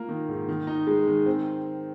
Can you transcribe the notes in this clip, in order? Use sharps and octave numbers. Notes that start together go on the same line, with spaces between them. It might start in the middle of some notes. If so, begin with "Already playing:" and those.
Already playing: A#3 F4
D#3
G#2
D#3
D#4
G#3
D#3
C4